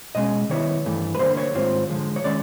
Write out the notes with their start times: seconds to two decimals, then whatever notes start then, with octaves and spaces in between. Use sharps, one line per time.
0.15 B2 G#3 C#4 D#5
0.49 D#3 G3 B3 E4 C#5
0.85 G2 E3 A3
1.15 B4
1.19 D3 G3 A#3 C5
1.37 C#5
1.54 G#2 D#3 G3 C4 F4
1.90 D3 F3 G#3
2.16 C#5
2.24 D#3 G#3 C#4 D5